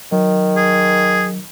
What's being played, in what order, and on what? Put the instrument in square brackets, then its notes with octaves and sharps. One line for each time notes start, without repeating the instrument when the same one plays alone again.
[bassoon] D#3 [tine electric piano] F#3
[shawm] G#4